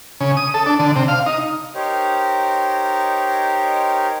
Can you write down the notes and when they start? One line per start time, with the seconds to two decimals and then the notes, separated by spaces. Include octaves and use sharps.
0.21 C#3
0.37 D#6
0.54 A4
0.66 D4
0.79 D3
0.96 C3
1.08 F5
1.26 D#4
1.75 D#4 G4 A#4 C5 C#5